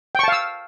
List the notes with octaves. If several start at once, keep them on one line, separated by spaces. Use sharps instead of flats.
F5 G5 A5 C#6 E6